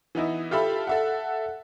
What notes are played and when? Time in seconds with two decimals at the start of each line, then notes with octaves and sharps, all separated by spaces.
0.15 E3 B3 D#4 E4
0.51 F4 G4 A4 E5 B5
0.87 A4 E5 F#5